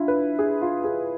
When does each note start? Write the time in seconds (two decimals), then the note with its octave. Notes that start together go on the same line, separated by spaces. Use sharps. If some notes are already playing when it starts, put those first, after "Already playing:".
Already playing: D4 E4 F4
0.08 B4
0.39 G#4
0.62 F4
0.84 G#4